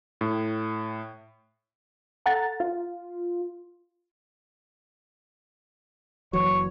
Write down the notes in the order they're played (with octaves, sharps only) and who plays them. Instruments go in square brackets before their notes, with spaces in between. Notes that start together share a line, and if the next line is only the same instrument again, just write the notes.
[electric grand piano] A2
[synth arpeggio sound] A4 F#5 A#5 A6
F4
[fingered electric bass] F#1 E3 F#3 [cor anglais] C#5